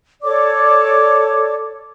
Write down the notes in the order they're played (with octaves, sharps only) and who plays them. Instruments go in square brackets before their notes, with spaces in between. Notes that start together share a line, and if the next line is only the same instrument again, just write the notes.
[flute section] A4 C#5 D5 D6